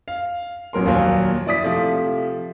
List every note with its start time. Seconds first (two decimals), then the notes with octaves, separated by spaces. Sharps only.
0.08 F5
0.73 A1 F#3 A#4 C6
0.86 D#2 A#2 F3 F#3
1.47 E4 D5 D#6 B6
1.64 C3 F3 A3